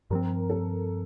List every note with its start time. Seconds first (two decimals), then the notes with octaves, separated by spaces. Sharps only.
0.10 G2 F3 C4 A#4
0.50 A4